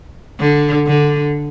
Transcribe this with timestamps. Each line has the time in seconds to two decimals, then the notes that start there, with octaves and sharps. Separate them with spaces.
0.40 D3
0.87 D3